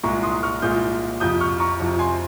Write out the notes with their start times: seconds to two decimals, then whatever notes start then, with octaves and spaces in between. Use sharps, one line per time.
0.03 C2 A#2 G#3 A#5 C#6
0.23 C6 D#6
0.43 C#6 F6
0.62 C2 A#2 G#3 D#6 G6
1.20 F2 C3 F3 D#6 G6
1.41 C#6 F6
1.60 A#5 C#6
1.80 F2 C3 F3
1.99 G#5 C6